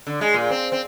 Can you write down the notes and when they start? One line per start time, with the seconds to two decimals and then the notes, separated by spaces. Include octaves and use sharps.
0.07 D3
0.21 G#3
0.34 A#2
0.51 C4
0.72 C4